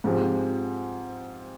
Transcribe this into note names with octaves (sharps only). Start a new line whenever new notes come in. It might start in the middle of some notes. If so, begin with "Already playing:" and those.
G#2 F3 G#3 C4 G4